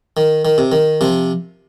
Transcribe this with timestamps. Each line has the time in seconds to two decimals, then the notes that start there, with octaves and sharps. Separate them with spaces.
0.17 D#3
0.45 D#3
0.58 C3
0.72 D#3
1.01 C3 F3